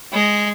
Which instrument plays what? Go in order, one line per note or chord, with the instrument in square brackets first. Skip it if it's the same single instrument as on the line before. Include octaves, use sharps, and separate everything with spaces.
[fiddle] G#3